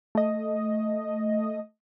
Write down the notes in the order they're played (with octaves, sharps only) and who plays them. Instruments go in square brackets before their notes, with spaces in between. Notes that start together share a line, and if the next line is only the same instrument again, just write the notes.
[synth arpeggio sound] A3 D#5